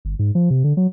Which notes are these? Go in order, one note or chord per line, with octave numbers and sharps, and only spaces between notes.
G1
G#2
F3
C3
D3
F#3